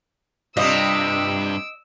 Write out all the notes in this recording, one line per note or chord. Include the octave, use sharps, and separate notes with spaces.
G2 C3 G3 F4 D#5 E6 D7